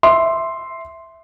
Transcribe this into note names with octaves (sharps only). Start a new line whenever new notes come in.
E5 C6